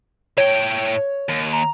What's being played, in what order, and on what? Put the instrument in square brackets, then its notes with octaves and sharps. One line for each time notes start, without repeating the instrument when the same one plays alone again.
[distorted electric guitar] A2 G5 [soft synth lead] C#5
[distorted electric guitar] D#2
[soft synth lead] A#5